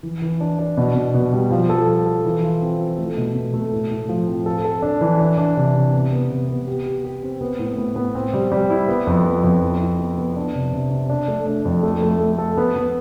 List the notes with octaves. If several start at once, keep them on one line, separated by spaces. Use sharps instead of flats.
E3
E3
D4
D4
B2
B2
B2
G3
F3
A4
A4
A4
E3
F4
C4
F4
A3
B2
B2
A3
A2
A2
F3
C4
A4
A4
D4
E3
D4
D4
C3
C3
B3
B3
C3
B3
G4
G4
G4
C4
B3
A2
B3
B3
C4
G3
G3
E4
B3
F2
B3
F2
E4
E4
B3
B3
D4
C3
C3
C3
D4
A3
D4
F2
A3
A3
A3
A4
B3
B3